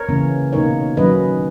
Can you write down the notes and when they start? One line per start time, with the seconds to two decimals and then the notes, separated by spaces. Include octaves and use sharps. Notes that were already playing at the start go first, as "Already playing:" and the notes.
Already playing: A#4 C#5
0.09 C#3 E3 A#3 C#4
0.52 B2 A#3 D#4 A#4 C#5
0.97 D#3 F#3 C#4 B4 D#5